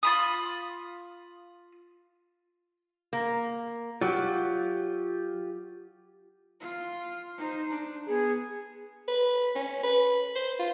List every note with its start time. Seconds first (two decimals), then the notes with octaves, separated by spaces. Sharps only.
0.03 F4 B5 D#6
3.13 A#3
4.01 F#3 F4 G4
6.60 F4
7.37 D#4 C5
7.71 D4
8.07 B3 G#4
9.08 B4
9.55 C#4
9.83 B4
10.36 C5
10.59 F4